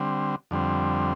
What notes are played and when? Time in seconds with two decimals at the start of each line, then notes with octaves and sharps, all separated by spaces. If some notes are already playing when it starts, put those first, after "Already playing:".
Already playing: D3 G3 C4
0.51 F2 D3 G3 C4